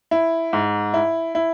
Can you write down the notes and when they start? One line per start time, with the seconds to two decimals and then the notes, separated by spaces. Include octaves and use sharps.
0.11 E4
0.53 G#2
0.94 E4
1.35 E4